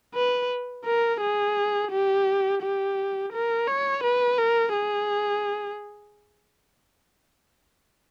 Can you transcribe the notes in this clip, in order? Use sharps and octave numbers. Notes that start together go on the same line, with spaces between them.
B4
A#4
G#4
G4
G4
A#4
C#5
B4
A#4
G#4